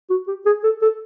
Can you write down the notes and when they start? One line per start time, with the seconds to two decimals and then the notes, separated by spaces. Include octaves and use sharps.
0.10 F#4
0.28 G4
0.46 G#4
0.64 A4
0.82 A4